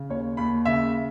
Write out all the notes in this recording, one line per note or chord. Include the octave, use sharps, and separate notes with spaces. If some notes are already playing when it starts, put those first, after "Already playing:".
Already playing: C#3
D#2 C#5
D#2 B5
C#3 E5